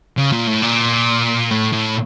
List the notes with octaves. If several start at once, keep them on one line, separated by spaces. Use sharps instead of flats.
C#3
A#2
A2
A#2
A2
A2